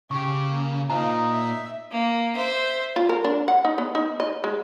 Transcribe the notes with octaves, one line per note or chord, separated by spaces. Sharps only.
C#3 G4 C#6
A#3
A#3 D#4 F4 C5 F5 A#5
E5
A#3
C5 E5
F4
A#4
D4
F#5
D#4
B3
D#4
D#5
G#3